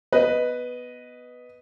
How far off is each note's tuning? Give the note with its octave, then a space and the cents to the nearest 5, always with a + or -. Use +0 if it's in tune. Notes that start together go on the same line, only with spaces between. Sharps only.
B3 +0 B4 +0 D#5 +0